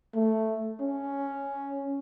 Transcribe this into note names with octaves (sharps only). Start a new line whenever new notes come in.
A3
C#4